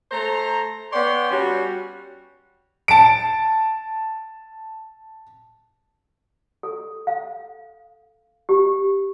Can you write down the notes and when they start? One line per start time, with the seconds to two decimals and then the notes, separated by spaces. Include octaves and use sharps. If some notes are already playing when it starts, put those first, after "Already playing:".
0.12 A3 C5 A#5
0.92 B3 C#5 D5 G5 C6
1.31 G3 C#4 F#4
2.88 A5 D7
6.63 A4
7.07 F5
8.49 G4